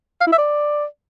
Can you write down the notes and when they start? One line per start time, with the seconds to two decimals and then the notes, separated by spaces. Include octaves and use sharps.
0.21 F5
0.27 E4
0.32 E5
0.38 D5